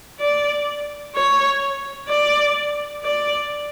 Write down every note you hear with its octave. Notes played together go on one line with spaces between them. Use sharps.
D5
C#5
D5
D5